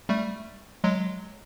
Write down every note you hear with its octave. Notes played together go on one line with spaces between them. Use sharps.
G3 A3
F#3 G#3